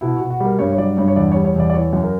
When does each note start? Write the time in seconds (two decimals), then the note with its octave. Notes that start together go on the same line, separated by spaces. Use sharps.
0.01 B2 E4
0.16 B2 F#4
0.30 F#4
0.40 G3 A#4
0.59 G2 C#5
0.72 C#5
0.78 F#3 D5
0.97 G2 C#5
1.08 C#5
1.16 E2 D5
1.32 G3 C#5
1.45 C#5
1.56 E2 D5
1.70 D5
1.74 E3 C#5
1.93 F#2
2.04 A#4